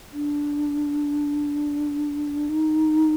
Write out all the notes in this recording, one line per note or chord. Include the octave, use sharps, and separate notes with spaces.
D4
D#4